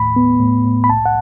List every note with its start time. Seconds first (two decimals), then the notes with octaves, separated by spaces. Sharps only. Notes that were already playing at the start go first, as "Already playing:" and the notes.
Already playing: D#2 A2 B5
0.16 B3
0.40 A2
0.64 A2
0.84 B5
0.90 C2 A5
1.06 F#5